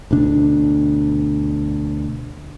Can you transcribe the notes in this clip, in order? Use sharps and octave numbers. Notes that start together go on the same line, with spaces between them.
D2 B2 D4